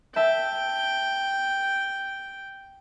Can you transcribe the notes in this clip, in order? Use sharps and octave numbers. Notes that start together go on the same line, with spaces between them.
E5 G5 A5